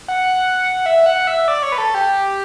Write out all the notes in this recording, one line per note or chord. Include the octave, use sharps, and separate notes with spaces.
F#5
E5
F#5
E5
D5
C#5
B4
A4
G4